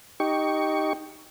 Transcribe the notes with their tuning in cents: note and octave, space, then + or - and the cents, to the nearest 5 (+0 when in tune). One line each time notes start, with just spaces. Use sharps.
D#4 +0 G4 +0 C#6 +10